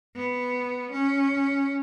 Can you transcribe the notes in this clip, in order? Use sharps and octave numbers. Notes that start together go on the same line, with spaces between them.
B3
C#4